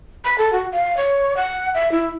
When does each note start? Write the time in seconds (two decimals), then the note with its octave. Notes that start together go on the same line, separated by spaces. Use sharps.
0.25 B5
0.38 A4
0.53 F#4
0.72 F5
0.97 C#5
1.37 F#5
1.74 E5
1.92 E4